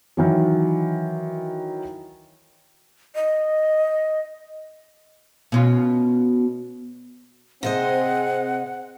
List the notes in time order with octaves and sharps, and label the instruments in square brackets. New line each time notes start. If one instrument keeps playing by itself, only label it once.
[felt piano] D#3 E3 F#3
[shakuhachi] D#5
[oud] B2 C#4 F4
[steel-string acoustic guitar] C3 C5 D#5 [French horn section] C4 G#4 [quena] F#5